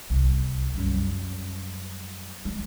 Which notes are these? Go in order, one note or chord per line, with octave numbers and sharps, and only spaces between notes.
C2
F#2 G3
G#3